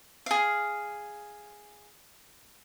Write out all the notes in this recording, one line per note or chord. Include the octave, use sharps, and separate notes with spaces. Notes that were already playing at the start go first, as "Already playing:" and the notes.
G#4 F5